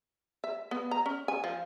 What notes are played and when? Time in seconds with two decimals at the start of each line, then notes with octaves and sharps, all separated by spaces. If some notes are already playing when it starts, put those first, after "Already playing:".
0.44 E5
0.71 B3
0.91 A#5
1.06 C#4
1.28 G#5
1.44 F3